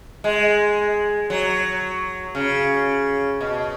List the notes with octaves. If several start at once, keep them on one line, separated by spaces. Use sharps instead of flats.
G#3
F#3
C#3
B2